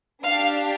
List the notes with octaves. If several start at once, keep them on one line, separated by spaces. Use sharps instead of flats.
D4 G4 F5